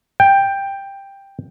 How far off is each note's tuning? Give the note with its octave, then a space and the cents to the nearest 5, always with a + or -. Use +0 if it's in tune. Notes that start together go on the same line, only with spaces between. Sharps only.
G5 +10